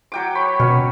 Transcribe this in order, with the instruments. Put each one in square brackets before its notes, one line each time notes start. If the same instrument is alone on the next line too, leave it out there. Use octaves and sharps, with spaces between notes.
[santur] F#3 G5 D6
[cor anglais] C#5 [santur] B5
[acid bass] B2 [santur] C#4